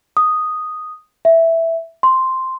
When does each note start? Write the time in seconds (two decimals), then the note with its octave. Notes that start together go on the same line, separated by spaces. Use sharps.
0.17 D#6
1.25 E5
2.03 C6